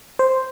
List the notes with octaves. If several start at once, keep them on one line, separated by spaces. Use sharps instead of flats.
C5